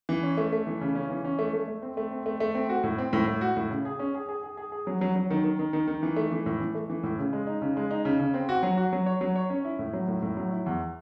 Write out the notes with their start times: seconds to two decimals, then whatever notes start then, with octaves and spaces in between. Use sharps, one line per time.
0.09 E3
0.23 C#4
0.37 A3
0.53 A3
0.67 E3
0.81 C#3
0.95 C#4
1.10 E3
1.24 C#4
1.39 A3
1.53 A3
1.68 A3
1.82 C4
1.97 A3
2.11 C4
2.26 A3
2.40 A3
2.55 C4
2.69 F#4
2.84 A2
2.98 C4
3.13 A2
3.27 A2
3.41 F#4
3.57 A2
3.71 C#3
3.85 G#4
3.99 C#4
4.15 G#4
4.29 G#4
4.43 G#4
4.57 G#4
4.72 G#4
4.87 F#3
5.01 F#3
5.16 F#3
5.30 D#3
5.44 D#3
5.59 D#3
5.73 D#3
5.87 D#3
6.03 E3
6.16 A3
6.31 E3
6.46 A2
6.61 E3
6.75 A3
6.90 E3
7.03 A2
7.18 C#3
7.33 G#3
7.47 D#4
7.62 C#3
7.77 G#3
7.91 D#4
8.05 C#3
8.20 C#3
8.34 C4
8.49 F#4
8.63 F#3
8.77 F#4
8.93 F#3
9.06 C#5
9.21 F#3
9.35 C#5
9.50 C#4
9.65 E4
9.79 A2
9.93 F#3
10.08 A2
10.22 A2
10.37 F#3
10.51 E4
10.66 E2